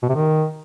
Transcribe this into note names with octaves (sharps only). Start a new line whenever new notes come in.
B2
C3
D#3